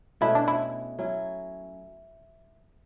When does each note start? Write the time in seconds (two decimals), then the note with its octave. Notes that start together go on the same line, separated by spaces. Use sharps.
0.21 B2 A3 C#4 E4 F#4
0.35 D4
0.48 E4
0.99 F#3 C#4 E4